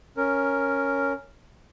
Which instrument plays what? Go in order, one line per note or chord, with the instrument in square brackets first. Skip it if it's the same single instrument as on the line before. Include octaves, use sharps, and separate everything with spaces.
[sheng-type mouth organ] C#4 A#4